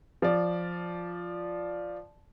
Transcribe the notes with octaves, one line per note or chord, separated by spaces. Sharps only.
F3 D5